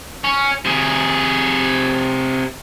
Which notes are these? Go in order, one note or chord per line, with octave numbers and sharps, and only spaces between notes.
C#4
C3 G#4